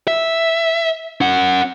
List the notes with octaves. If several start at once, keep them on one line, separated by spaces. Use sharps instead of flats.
E5
C#4 F#5